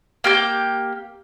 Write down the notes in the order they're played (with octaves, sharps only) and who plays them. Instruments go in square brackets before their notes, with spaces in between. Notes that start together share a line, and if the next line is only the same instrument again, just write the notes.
[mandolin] A#3 G4 G6